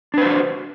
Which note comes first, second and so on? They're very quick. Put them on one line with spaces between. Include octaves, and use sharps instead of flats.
D4 B4 C5 F#4